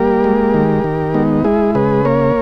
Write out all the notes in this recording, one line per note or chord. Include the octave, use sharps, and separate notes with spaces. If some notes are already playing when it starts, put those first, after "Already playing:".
Already playing: G3 A#3 G4 A#4
G#3
D#3
D#3
G#3 B3 D#4
G#3 E4 G#4
C#3 G#4 B4
A#3 A#4 C#5